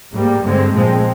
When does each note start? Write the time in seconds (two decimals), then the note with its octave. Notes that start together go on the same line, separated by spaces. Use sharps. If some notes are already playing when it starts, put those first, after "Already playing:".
0.13 G#2 G3 A#3
0.43 G2 D3 G#3 C4
0.72 A#2 F3 G#3 C4